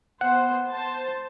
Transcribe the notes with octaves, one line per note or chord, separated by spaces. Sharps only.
B3 C5 F#5
C5 A5